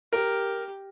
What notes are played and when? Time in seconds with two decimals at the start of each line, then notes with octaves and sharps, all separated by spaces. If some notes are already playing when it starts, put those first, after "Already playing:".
0.13 G4 A#4